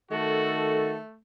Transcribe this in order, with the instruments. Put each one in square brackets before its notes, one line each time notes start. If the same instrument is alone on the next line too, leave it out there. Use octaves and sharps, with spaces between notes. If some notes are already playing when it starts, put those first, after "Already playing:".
[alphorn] D#3 [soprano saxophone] A3 [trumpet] F#4 [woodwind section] A4